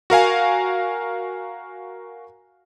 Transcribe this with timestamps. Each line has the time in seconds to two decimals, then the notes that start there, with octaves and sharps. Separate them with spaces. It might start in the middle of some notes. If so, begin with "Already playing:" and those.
0.10 F#4 A#4 F5 G#5